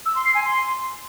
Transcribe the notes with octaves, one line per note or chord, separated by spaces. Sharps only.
E6
C6
C7
G#5
C6